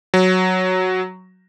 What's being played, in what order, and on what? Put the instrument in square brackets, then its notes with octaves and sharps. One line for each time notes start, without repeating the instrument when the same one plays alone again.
[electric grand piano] F#3